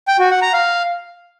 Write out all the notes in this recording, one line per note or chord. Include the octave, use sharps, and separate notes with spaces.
G5
F#4
F#5
A#5
F5